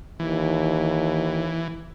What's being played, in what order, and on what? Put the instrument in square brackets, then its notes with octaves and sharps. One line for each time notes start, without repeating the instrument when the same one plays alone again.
[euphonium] D#2 [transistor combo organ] E3